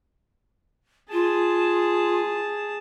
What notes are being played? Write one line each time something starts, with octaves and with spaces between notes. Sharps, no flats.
F4 G#4 A5